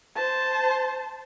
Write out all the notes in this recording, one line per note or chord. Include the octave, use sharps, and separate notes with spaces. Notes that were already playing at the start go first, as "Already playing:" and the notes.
C5 A5